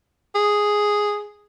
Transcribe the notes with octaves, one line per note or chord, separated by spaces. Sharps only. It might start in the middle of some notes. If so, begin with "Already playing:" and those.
G#4